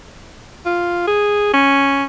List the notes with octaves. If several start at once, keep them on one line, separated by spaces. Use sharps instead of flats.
F4
G#4
C#4